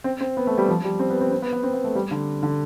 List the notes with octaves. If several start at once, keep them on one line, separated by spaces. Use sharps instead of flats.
C4
C4
B3
A3
G3
F3
G3
C4
B3
C4
C4
B3
B3
C4
B3
A3
G3
D3
D3